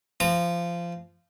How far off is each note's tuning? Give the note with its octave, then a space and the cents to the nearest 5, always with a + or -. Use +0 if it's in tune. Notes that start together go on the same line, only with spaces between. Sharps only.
F3 -20 A#5 -25 D#6 -40